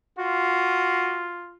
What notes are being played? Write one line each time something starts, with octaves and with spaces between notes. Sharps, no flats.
F4 F#4